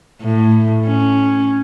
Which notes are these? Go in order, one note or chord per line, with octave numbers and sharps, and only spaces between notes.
A2
C#4